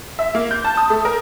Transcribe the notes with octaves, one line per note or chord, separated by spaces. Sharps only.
E5
A#3
G6
A5
D#6
A3
A#4